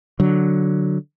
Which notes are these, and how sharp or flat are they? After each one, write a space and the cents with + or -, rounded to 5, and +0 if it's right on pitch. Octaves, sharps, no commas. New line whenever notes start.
D3 +0 F#3 +0